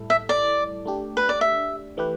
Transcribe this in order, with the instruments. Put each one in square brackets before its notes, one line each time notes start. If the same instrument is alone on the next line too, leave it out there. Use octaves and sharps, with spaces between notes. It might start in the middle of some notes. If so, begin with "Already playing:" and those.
Already playing: [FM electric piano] A2 G3 E4 A4
[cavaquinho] E5
D5
[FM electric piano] A3 D4 G4
[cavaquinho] B4
D5
E5
[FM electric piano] E3 A3 G4 B4